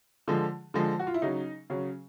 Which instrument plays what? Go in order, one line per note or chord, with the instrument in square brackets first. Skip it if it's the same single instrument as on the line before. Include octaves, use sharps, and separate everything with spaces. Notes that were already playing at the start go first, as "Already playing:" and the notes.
[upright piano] D3 F3 G#3
D3 F3 G#3
F#4
F4
E4
C#3 F#3 D#4
C#3 F#3